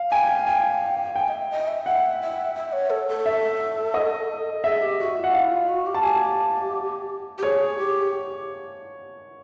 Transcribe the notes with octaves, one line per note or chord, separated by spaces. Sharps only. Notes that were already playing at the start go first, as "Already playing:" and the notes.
Already playing: F5
G5 G#5
G5 G#5
G5 G#5
D#5
E5
D#5
E5
E5 F#5
E5
E5
C#5
A4
A4
E5
D#5
G#4 E5
G4
F#4
F4
F#5
E4 F5
F4
F#4
G4
A5
G4 G#5
G4
G#4 C#5
G4